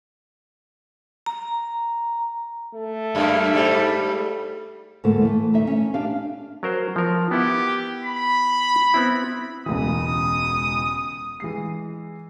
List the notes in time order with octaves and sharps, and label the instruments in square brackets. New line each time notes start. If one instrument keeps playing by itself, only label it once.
[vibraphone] A#5
[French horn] A3
[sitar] F#2 G3 A#3
G#2 G3
[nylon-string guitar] D2 G#2 A3 A#3 A4
E3 A3
D2 D#4 E5
C#4
D4 G4 F5
[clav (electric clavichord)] F#3 A#4 C5
F3 A#4
[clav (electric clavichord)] B3 E4 F#5 [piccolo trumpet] G4
[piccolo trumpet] B5
[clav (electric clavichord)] B3 C4 E4
[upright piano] E1 C#2 E3 [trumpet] D#6
[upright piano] E3 G#3 C7